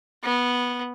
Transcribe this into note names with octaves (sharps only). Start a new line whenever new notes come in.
B3